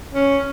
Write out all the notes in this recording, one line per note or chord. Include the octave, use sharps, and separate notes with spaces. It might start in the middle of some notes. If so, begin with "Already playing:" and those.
C#4